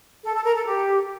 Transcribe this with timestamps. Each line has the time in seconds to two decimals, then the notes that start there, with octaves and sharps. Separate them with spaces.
0.22 A4
0.33 A4
0.44 A#4
0.55 A4
0.65 G4